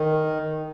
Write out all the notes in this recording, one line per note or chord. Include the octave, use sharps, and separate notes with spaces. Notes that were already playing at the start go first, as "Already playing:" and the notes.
Already playing: D#3